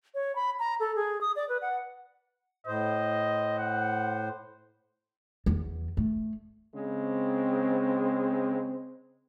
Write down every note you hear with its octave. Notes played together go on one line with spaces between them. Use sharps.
C#5
B5
A#5
A4
G#4
D#6
D5
B4
F#5
A2 C5 D#5
F#5
E2
A3
C#3 G#3 C4